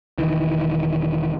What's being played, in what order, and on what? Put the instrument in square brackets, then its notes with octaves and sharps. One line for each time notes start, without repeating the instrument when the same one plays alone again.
[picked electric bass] E1 C#2 D#3 E3